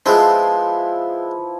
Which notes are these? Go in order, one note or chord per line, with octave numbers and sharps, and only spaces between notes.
F3 G#3 B3 C4 E4 B4